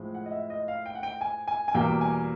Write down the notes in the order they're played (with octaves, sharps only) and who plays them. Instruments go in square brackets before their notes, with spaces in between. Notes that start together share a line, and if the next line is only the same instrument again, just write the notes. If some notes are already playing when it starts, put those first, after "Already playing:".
Already playing: [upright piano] A2 F3 G#3
F#5
D#5
E5
D#5
F5
G5
F#5
G5
G#5
G#5
G#5
E2 B2 G3 A#3 G5
G#5